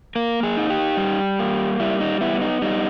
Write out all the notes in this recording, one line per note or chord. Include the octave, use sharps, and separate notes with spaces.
A#3 A#4
G#4
D#4
G4
G3
A#3
G3 E4
D#4
B3 E4
D#4
G3 D#4